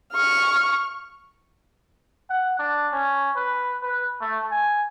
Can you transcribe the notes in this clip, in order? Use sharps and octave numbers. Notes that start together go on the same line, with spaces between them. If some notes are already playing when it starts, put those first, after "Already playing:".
C#6 F6
F#5
D4
C#4
B4
B4
A3
G#5